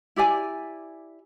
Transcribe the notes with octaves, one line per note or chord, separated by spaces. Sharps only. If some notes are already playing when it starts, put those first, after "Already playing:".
E4 G4 D5 G#5